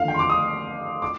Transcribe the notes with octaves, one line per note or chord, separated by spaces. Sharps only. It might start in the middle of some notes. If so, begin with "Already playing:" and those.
Already playing: D#2 D3 F3 F5
G5
C6
D6
D#6
D6